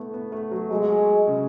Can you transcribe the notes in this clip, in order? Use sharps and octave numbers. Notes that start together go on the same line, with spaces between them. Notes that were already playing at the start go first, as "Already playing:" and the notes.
Already playing: A3 B3 E4
B3
A3
F#3
F#3 G#3
C#3